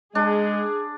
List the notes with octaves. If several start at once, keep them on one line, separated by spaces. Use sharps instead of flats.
G#3 D4 G#4